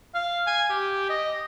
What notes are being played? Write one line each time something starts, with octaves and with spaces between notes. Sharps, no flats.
F5
G#5
G4
D#5